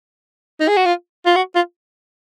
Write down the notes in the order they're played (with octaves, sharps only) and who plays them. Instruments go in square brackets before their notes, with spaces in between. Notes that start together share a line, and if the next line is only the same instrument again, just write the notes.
[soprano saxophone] D#4
G#4
F#4
F4
F4
F#4
F4